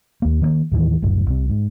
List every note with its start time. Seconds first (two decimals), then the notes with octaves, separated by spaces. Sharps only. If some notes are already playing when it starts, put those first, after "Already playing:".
0.22 D#2 A#3
0.42 D#3 G3 A#3
0.72 D#2 A2 D#3 E3
1.02 F#1 C2 F#2 A2
1.26 C2 C3
1.49 G#2